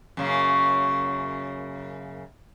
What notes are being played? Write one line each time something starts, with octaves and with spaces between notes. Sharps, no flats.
F#2 C#3 A#3